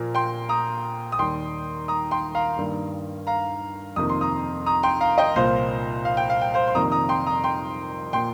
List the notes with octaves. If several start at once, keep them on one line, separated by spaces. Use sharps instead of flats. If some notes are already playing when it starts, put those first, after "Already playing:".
Already playing: A#2 F3 A#3
G5 C6
A#5 D#6
D#6
D#2 D#3 G3 G5 C6
A#5 D#6
G5 C6
F5 A#5
G2 D#3 G3 A#3
F5 A#5
F2 C3 D#3 A#3 D#6
C6
A#5 D#6
A#5 D#6
G5 C6
F5 A#5
D#5 G5
C2 A#2 F3 A#3 C5 F5
F5
G5
F5
G5
C5 F5
C6
F2 C3 D#3 G3 A#3 A#5 D#6
A#5 D#6
G5 C6
A#5 D#6
G5 C6
A#2 F3 A#3 G5 C6